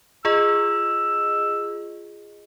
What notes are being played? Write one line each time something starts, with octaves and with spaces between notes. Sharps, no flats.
F4 G#4 D#5 E6